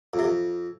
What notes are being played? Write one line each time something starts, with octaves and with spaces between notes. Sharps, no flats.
F2
C3
F2